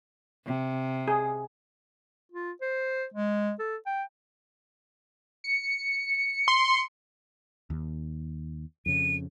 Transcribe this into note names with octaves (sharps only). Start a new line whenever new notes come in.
C3
G#4
F4
C5
G#3
A4
G5
C#7
C6
D#2
F2 C#3 D#7